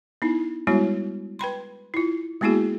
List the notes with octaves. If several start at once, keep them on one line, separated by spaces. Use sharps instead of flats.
B3 D#4 E4
G3 G#3 B3 E4 F#4 C#5
B4 G5 B5 C6
E4 F4
G#3 A#3 B3 E4 F#4 G#4